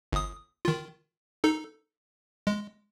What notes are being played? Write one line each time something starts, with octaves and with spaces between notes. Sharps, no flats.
G1 D#6
D#3 F4
D#4 A4
G#3